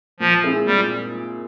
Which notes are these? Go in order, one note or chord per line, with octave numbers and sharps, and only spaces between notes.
A#2 F3
G#3 C4 E4 G#4
A#2 G3